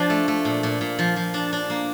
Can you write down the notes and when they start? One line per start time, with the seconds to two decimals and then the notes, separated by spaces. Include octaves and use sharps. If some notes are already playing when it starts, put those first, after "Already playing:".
Already playing: F3 D4
0.10 A3
0.28 A3
0.45 A#2
0.63 A#2
0.81 A#2
0.99 F3
1.16 F3
1.34 D4
1.53 D4
1.70 A#3